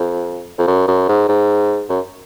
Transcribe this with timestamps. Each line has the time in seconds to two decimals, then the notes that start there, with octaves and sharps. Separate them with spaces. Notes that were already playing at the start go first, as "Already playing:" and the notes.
Already playing: F2
0.58 F2
0.67 F#2
0.88 F#2
1.08 G#2
1.28 G#2
1.89 F#2